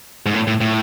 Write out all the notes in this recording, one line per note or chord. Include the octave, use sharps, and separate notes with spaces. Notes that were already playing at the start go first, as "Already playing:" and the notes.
G#2
A2
A2
A2